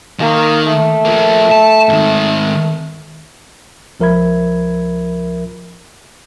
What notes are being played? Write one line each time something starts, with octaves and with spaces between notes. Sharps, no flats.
D#3 A#3
A3
F3 A#3
A5
G#2 D#3
C#2 F3 A#4 E5 B5 G#6